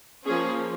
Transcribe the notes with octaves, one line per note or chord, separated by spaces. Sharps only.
F3 A#3 C#4 G#4